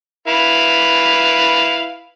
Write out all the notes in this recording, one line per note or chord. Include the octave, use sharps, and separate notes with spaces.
E4 B4 F5